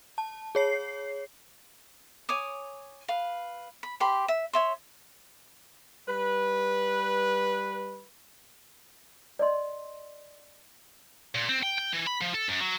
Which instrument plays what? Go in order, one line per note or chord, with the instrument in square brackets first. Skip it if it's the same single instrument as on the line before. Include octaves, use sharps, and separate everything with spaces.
[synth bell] A5
G#4 C#5 C7
[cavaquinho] C#5 G#5 D6 D#6
B4 F5
B5
G4 C5 B5 C6
E5
C#5 E5 C6
[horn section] G3 B4
[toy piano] D5 D#5 C6
[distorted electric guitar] A#2
C4
G5
G5
E3
B5
F3
A4
F#2
F#3